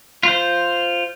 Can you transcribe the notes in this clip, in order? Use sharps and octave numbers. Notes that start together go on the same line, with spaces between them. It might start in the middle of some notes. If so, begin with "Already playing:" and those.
F4 C5